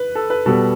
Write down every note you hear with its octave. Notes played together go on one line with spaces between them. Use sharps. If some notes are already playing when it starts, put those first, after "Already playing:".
Already playing: B4
A4
B4
B2 G3 B3 A4